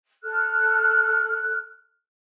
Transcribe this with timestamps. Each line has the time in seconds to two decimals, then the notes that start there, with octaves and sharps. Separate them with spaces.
0.23 A4 F6 F#6